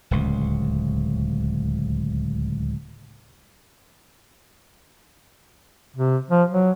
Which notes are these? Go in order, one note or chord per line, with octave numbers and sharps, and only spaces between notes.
D1 C#2
C3
F3
F#3